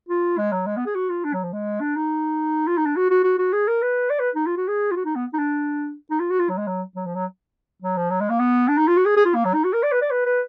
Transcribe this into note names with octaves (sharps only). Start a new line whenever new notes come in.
F4
G#3
F#3
G#3
B3
G#4
F#4
F4
D4
F#3
F3
G#3
D4
D#4
F4
D#4
D4
F#4
F#4
F#4
F#4
G#4
A#4
B4
D5
B4
D#4
F4
F#4
G#4
F4
F#4
D#4
B3
D#4
D4
D#4
F4
F#4
F4
F#3
G#3
F#3
F#3
F3
F#3
F#3
F3
F#3
G#3
A#3
B3
D4
D#4
F4
F#4
G#4
G#4
F4
A#3
F#3
D#4
F#4
A#4
D5
B4
D5
B4
B4